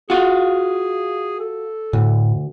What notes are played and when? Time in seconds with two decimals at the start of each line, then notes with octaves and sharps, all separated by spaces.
0.10 F4 F#4 G#4
1.40 A4
1.93 D2 A2